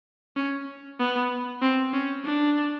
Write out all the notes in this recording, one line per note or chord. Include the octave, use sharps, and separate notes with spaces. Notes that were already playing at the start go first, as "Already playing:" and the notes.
C#4
B3
C4
C#4
D4